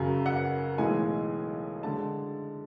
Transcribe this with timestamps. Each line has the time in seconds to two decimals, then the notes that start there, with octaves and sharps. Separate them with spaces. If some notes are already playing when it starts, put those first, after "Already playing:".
Already playing: F#2 C#3 F#3 G#5
0.26 F#5
0.78 B1 A2 E3 G#3 G#5
1.83 D3 G#3 A5